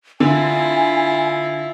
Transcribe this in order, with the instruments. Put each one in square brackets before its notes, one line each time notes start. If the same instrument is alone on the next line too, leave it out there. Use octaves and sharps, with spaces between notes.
[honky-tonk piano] D3 [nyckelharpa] E4 F4 [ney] G#5